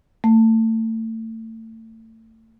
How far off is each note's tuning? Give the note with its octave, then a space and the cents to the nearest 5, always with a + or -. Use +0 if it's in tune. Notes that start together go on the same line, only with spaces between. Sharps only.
A3 +30